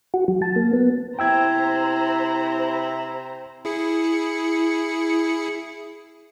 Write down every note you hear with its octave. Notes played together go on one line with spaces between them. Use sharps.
F#4
F#3
A5
A#3
B3
C3 E4 C5 G5 A#5 E6 G#6
E4 G#4 C#7